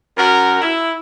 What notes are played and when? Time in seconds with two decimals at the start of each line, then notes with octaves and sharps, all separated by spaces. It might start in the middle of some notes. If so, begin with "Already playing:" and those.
0.17 F#2 F#4 A#4
0.62 E4